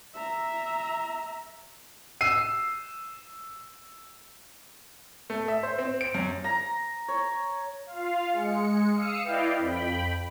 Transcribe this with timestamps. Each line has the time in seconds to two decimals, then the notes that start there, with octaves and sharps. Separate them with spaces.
0.15 E5 A#5
2.21 E6 C7 D#7
5.30 A3
5.48 E5
5.63 C5
5.78 C4
6.01 D7
6.15 F#2
6.44 A#5
7.08 C#5
7.86 F4 F5
8.32 G#3 C#7
8.93 F5 D#6 E6 C#7
9.24 E4 B4 D5 D#5 F5 G5
9.58 F2 G5 B5